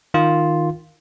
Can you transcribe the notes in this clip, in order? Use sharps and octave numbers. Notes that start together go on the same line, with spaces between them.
D#3 F4